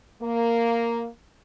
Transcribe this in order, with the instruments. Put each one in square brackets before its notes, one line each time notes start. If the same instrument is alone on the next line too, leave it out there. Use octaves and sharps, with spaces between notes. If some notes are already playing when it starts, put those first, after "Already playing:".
[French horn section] A#3